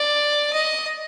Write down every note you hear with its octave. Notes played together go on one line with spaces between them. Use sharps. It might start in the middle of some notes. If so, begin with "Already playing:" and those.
Already playing: D5
D#5